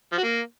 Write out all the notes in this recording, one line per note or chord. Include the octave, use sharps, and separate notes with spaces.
F3
F#4
A#3